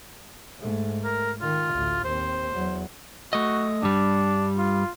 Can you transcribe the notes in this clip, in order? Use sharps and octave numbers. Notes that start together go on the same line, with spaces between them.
G#2 A3
A#4
D#3 F4
A1 D2
D#2 C4 C5
E2 F#3
A3 F#4 D#5
G2 G3 D4
F4